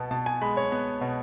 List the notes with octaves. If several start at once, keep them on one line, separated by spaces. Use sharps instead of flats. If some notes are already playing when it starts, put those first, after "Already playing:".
Already playing: B2 B3 A5
B2 A5
G#5
G#3 B5
C#5
B3
B2